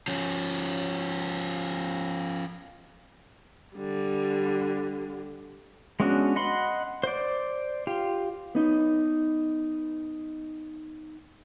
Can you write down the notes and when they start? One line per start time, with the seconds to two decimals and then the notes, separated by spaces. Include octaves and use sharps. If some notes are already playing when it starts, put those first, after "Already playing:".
0.08 F3 C#4
3.75 D3 G3
6.00 G#3 B3 C#4 D4 F#4
6.36 D#5 F#5 B5 C6
7.04 C5 D5
7.87 F4 G4
8.55 B3 D#4